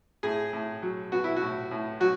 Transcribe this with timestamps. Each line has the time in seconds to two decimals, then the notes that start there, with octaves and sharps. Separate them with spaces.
0.23 A2 G#4
0.53 A2
0.82 F#3
1.12 B3 F#4
1.24 E4
1.36 F#4
1.42 A2
1.71 A2
2.00 F#3 F#4